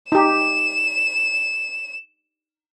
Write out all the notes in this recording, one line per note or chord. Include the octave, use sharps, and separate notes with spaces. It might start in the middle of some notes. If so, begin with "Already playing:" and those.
D#4 G4 E7